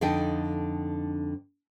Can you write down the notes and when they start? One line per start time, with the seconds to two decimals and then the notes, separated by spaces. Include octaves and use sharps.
0.01 F2 D3 D4 D#4 D#5 G5